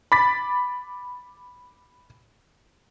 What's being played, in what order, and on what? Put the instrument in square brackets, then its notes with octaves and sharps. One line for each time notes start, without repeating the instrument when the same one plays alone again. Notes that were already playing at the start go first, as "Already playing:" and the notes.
[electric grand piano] B5 D6 A6 B6